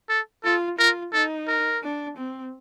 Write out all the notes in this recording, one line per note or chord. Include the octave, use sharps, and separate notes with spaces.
A4
F4 A4
F4 A#4
D#4 A4
A#4
D4
C4